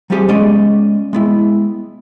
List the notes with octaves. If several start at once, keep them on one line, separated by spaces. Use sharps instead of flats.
F#3 G3 A3 C4 G4 G#4
G#3 B3 C#4 D5 D#5
G#3 B3 E4